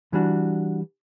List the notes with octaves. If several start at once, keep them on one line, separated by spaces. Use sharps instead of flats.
E3 G3 D4 F#4